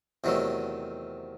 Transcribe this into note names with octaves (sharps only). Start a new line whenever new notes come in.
E2 C3 D#3 F#3 A3